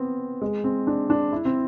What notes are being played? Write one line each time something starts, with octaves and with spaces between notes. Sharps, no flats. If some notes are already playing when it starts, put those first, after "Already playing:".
Already playing: B3 C4
G#3
C4
D4
D4
E4
C4